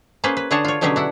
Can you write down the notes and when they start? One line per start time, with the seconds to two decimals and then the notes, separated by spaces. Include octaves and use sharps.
0.24 A#3 C#4 G#4 B4 C5
0.37 B4
0.51 D3 D4 G#4 C#5 F#5 A5
0.65 F4 C#5
0.81 B2 D3 F#3 C#4 G4 G#4
0.96 D4 E4 F#5